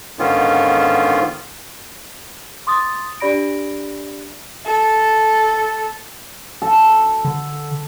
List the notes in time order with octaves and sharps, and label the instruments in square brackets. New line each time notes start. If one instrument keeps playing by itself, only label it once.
[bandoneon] G#2 D3 D#3 B3 C#4 F4
[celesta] C6 D6 D#6 A6
D4 G4 D5 B5 A#6 D7
[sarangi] A4
[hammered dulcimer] A4 A5
[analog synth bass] D3